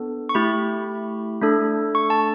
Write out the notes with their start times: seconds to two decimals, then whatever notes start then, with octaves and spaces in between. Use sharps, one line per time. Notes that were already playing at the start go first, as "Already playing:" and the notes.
Already playing: B3 D4 A4
0.29 C#6
0.34 A3 E4 G4 B5
1.41 A3 D4 A4
1.95 C#6
2.10 A5